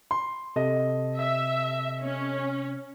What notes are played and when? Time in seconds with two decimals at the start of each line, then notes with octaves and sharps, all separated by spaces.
0.11 C6
0.56 C3 A4 D#5
1.17 E5
2.03 C#4